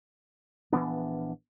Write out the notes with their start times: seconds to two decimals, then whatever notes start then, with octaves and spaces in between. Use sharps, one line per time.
0.73 A#1 E3 B3 D4